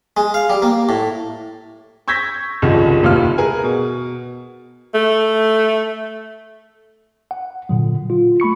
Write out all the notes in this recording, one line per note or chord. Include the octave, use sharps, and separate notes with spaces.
G#3
F5
G3
A#3
A2
C#6 E6 G6 G#6 A#6 B6
F#1 C2 D#3 F3
F1 D#2 C3 E4 F4 F6
G#4 A#4 B4 G#5
B2
A3
F#5
A#2 D3 F#3
F#3 F4
A3 B5 C#6 C#7